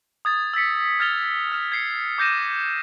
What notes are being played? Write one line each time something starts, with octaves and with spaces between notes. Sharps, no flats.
D#6 G#6 A6
E6 A6 B6 C#7
F6 G#6 A6 F7 G7
F6 F7
G#6 C7 C#7
D6 G6 A#6 D#7 E7